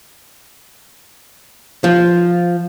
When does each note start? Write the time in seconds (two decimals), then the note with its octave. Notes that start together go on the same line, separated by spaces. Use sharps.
1.84 F3